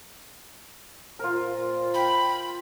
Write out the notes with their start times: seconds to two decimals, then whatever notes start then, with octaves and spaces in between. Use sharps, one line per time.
1.19 A#2 F4 A#4 C5
1.94 G5 B5